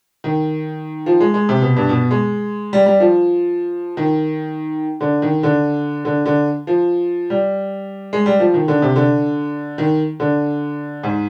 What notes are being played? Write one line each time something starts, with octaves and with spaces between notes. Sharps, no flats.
D#3
F3
G#3
G#3
C3
B2
G2
B2
G#3
G3
G3
F3
D#3
D3
D#3
D3
D3
D3
F3
G3
G#3
G3
F3
D#3
D3
C3
D3
D#3
D3
G#2